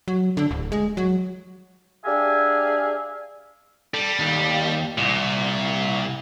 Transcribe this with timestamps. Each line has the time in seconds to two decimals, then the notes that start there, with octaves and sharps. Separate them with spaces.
0.08 F#3
0.37 D3
0.51 D1
0.72 G#3
0.97 F#3
2.05 D4 G4 G#4 E5 F5 G#5
3.94 G3 A4
4.19 D#2
4.98 C2 A#2